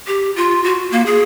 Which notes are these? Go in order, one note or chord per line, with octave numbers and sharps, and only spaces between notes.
G4
F4
F#4
A#3
G#4